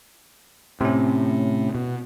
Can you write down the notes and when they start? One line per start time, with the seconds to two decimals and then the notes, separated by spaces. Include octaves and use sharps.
0.81 A2 C3 C#4
1.75 B2